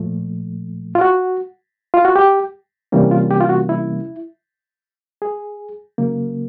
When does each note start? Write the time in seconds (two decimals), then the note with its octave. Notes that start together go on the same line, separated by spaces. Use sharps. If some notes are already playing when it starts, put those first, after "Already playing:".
Already playing: A#2 F3 A3
0.95 F4
1.01 F#4
1.94 F4
2.05 F#4
2.16 G4
2.92 C3 E3 G3 A#3 C#4
3.11 F4
3.31 G4
3.41 F4
3.49 F#4
3.69 E4
5.22 G#4
5.98 C#3 F#3 A#3